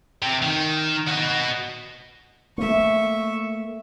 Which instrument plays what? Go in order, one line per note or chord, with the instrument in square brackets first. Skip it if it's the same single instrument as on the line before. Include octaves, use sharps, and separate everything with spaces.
[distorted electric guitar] C3
D#3
F#4 D#5
[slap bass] A3 A#3 [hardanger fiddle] E5 C#6